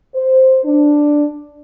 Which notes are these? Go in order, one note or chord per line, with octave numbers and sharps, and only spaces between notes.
C5
D4